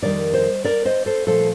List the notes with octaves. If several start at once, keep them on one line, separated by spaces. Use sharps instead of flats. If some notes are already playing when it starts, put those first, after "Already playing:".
F2 D#3 G3 A#3 A#4 D5
C5 D#5
A#4 D5
C5 D#5
A4 C5
A#2 F3 A3 A4 C5